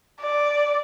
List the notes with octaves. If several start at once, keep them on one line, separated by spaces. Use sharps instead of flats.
D5